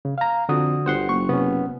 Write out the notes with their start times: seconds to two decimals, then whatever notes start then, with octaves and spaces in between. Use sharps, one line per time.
0.05 C#3
0.18 F5 A#5
0.49 F2 D3 F#4 D#6
0.86 G1 C5 F#5 C6
1.09 F#1 C#6
1.29 C3 B3 C#4